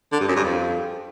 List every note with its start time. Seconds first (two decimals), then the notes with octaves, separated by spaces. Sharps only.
0.12 D3
0.20 G2
0.28 F#2
0.36 G2
0.44 F2